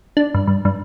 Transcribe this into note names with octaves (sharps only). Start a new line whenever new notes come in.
D4
G2
G2
G2